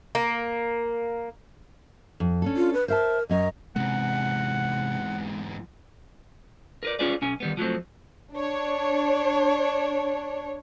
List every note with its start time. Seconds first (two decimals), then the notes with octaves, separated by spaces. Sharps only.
0.15 A#3
2.20 F2
2.42 C#4 D4 A4
2.57 F4
2.74 B4
2.88 A#4 C5 E5 A5
3.29 F#2 C#4 A#4 D#5
3.76 E2 G#2 C3 G#3 C4 F#5
6.83 A#4 B4 D5
6.99 C#4 F4 G#4 B4 D5
7.21 B1 C#4 G#5
7.40 D#3 G3 B3
7.57 F3 F#3 A3 C4
8.34 D4 C#5